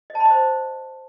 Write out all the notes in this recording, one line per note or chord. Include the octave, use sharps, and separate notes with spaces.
D#5
A5
B5
D#5
C5